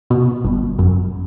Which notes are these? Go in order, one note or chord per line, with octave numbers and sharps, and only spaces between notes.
B2
G1
F#2